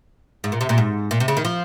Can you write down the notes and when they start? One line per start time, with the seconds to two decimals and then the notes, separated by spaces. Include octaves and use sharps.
0.44 G#2
0.52 A#2
0.61 C3
0.69 A#2
0.78 G#2
1.11 A#2
1.20 C3
1.28 C#3
1.37 D#3
1.45 F3